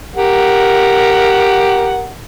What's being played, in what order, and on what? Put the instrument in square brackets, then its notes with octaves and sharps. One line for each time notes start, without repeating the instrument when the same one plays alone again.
[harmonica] G4 A#4 F#5